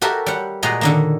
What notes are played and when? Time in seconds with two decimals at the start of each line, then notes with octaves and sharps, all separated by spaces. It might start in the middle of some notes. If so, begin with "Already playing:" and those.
0.02 F#4 G4 A4 A#4 E5
0.26 G3 F#5
0.63 A#2 G#3 F#4 D#5 A#5
0.81 D3 D#3 A#3